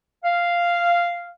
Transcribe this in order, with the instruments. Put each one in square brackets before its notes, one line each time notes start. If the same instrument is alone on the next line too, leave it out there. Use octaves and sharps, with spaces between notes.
[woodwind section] F5